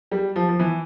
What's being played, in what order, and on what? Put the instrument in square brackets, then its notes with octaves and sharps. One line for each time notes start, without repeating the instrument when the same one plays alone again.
[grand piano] G3
F3
F3
E3